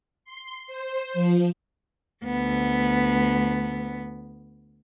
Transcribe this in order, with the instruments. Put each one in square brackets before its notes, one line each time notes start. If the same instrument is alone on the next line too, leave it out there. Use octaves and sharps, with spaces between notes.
[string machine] C6
C5
F3
[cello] D2 B3